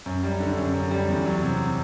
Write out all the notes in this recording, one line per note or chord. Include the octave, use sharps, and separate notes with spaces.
F#2
G3
D3
F#2
F#2
G3
E2
F#3
C3